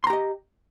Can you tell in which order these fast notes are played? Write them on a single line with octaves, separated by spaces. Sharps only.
C6 A#5 G4 D#5